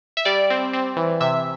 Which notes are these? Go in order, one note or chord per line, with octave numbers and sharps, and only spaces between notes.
E5
G3 D5
C4
C4
E3
C3 E5